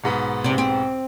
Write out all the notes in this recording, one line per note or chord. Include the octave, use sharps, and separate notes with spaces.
B1 G#2 B3
C3 C4
C4